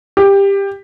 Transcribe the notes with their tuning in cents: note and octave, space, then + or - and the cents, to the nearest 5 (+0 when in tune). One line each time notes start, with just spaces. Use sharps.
G4 +15